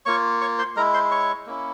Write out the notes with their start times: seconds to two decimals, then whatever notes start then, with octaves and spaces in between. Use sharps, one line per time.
0.06 A#3 F4 C#5 C#6
0.41 C#5 C#6
0.58 C5 C6
0.76 G#3 E4 A#4 A#5
0.94 C5 C6
1.11 C#5 C#6
1.46 A#3 C#4 E4